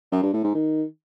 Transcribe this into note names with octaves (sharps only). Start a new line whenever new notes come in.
F#2
G2
A2
G#2
D#3